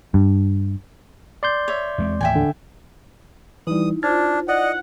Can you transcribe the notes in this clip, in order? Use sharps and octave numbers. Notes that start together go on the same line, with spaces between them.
G2
D5 C6 G6
C#5 E5
E2 G#3 C4
D#2 A2 E3 E5 G5 G#5
D3
E3 G3 D#4 E4 D#6
D4 F4 C5 F6 G#6 A6
D5 D#5 F#5